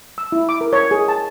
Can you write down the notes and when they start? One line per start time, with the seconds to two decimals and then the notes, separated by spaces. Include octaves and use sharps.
0.18 E6
0.32 E4
0.49 D6
0.61 A#4
0.73 C#5
0.91 G#4
1.08 A5